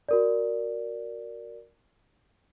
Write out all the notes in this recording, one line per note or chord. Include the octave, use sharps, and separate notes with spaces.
F#4 A#4 D5